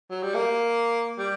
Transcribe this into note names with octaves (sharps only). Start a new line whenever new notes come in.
F#3
G3
A#3
G3